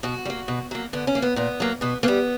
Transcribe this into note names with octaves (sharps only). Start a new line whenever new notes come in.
B2 F#4
G3
A#3
B2
F#3 A#3
D3 B3
C#4
A#3
B3
A#2 B3
F#3 A#3
B2 B3
G3 A#3 B3